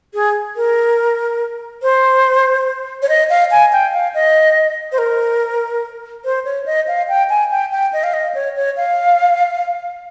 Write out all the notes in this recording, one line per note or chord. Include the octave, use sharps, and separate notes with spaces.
G#4
A#4
C5
C#5
D#5
F5
G#5
G5
F5
D#5
C5
A#4
C5
C#5
D#5
F5
G5
G#5
G5
G5
D#5
F5
D#5
C#5
C#5
F5